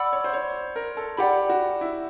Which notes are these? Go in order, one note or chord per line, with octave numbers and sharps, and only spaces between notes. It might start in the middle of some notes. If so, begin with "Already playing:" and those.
Already playing: D5 F#5 B5 E6
C#5
C5
C#5
A#4
A4
G4 D5 F#5 B5
F#4
E4